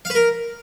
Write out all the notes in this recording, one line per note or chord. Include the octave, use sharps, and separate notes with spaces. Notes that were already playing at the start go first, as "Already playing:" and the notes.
F5
B4
A#4